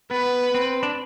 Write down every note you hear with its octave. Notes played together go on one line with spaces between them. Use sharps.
B3 B4
C4
D4